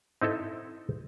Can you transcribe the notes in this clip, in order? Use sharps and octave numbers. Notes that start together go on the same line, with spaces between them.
C4 D#4 E4 A4